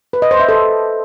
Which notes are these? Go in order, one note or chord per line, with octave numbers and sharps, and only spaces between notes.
B4
D#5
C5
E5
A4